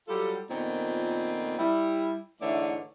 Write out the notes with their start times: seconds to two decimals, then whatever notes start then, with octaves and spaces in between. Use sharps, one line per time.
0.08 F#3 G3 F4 G4 A4
0.50 F2 A#2 D#3 B3 C4
1.58 G3 E4
2.41 G#2 D3 E3 A3 C#5 D5